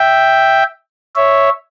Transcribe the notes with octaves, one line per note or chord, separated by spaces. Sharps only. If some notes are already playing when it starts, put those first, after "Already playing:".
Already playing: E5 G5
C#5 E5